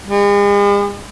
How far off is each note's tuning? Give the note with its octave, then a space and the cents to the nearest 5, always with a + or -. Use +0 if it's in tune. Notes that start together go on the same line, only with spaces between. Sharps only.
G#3 -45